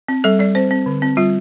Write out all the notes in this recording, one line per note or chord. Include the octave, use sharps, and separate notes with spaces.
C4
G3 A4
G3 D5
C4 C5
C4
D3
C4
G3 F4